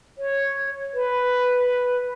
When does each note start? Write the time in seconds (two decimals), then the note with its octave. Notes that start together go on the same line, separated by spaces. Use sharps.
0.18 C#5
0.94 B4